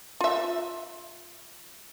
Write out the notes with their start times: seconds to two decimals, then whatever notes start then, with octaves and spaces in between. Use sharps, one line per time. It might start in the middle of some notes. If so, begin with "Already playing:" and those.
0.21 F4 E5